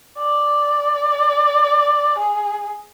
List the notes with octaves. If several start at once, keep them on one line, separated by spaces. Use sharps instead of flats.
D5
G#4